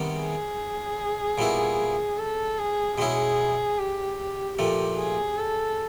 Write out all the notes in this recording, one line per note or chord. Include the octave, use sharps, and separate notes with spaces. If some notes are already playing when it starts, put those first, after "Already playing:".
Already playing: C3 D#3 G3 B3
G#4
A#2 G3 B3 E4
A4
G#4
B2 G#3 C#4 E4 G#4
G4
A#2 F3 A3 G4
G#4
A4